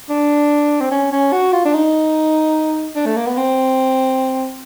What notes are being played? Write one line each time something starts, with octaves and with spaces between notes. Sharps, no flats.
D4
C4
C#4
C#4
F#4
F4
D4
D#4
D4
A3
A#3
B3
C4